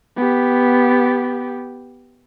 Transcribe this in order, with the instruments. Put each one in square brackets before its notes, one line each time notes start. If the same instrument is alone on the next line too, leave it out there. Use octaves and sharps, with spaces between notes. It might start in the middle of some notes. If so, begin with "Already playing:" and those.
[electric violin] B3 G4